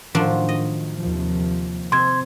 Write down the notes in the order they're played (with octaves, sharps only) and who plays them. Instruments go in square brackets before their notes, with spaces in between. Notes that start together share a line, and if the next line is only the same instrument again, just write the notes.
[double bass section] A2 D#3 [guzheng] F3 F#3 D4
[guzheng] D#5
[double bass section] D#2 C3 F3
[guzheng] C3 [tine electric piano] C6 G#6